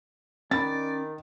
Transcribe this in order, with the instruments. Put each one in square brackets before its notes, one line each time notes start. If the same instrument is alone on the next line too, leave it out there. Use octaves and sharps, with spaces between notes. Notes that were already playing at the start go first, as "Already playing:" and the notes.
[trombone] D#3 [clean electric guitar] C#4 B5 [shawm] D5 [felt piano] A6